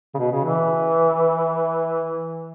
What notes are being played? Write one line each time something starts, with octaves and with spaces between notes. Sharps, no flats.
C#3
B2
C#3
E3